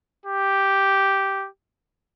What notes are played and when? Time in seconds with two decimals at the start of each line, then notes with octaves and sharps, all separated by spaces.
0.26 G4